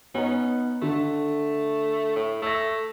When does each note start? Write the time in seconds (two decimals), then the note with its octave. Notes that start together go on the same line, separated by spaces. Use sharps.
0.14 B3 C#4 D#4
0.82 D3 A3
2.16 A2
2.42 A3 E6 A#6